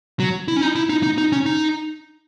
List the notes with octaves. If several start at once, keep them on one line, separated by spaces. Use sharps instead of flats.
F#3
E4
C#4
D#4
E4
D#4
D#4
D#4
C#4
D#4